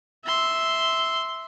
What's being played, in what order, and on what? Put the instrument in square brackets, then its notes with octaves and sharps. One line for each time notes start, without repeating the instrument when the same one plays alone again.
[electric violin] E5 C6